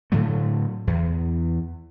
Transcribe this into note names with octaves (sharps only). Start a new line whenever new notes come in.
A2 D3 F#3 A3
E2